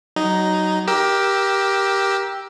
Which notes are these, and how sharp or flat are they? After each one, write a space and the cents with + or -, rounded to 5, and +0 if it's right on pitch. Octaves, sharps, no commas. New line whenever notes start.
F#3 +25 D#4 +0
G4 +0 A#4 +20 E6 +0